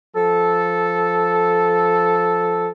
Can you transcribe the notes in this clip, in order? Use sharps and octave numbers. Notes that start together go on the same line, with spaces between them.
F3 A4